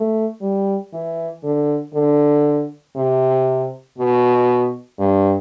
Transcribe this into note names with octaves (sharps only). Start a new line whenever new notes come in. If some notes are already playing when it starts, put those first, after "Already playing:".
Already playing: A3
G3
E3
D3
D3
C3
B2
G2